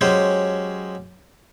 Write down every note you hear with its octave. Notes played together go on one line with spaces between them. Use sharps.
F#3 G#3 C#4 G4 C5